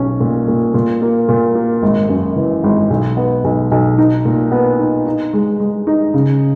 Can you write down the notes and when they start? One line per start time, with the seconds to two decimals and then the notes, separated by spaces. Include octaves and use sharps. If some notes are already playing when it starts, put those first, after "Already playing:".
Already playing: B1 C#4
0.20 A#2
0.48 A#2
0.74 A#2
1.02 A#3
1.28 A#2
1.55 A#3
1.82 G#1
2.09 F#2
2.36 E3
2.64 G#1
2.90 B1
3.17 B3
3.44 B1
3.71 B1
3.98 D#4
4.25 A#2
4.52 B3
4.79 D#4
5.06 D#4
5.33 G#3
5.60 G#3
5.87 D#4
6.14 C#3